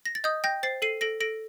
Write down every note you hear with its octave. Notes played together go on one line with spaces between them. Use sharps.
A#6
A6
D#5 D#6 G6
G5 G6 A#6
C5 A6 C7
A4 C7 D#7
A4 A#6 D7
A4 A#6 D7